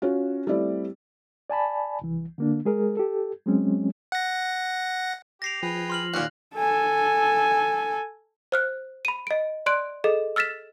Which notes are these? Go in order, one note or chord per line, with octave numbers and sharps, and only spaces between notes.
C#4 F4 F#4
G3 A3 C4 E4 D5
D5 G#5 A5 B5
C2 E3
D3 A#3 D4
G#3 G#4 A#4
G4 A4
F#3 G#3 C4 C#4
F#5 A#6
G4 A#6 C7 F7
F3 G#4 B4 G5
C6 F6 F#7
D#2 A#2 C#4 F#4 G4 F#6
A4 G#5
C5 F6 F#6
B5 D#7
D#5 D7
D5 C6 F#6 D7
G#4 A4 D#5
E6 F6 A6 B6 E7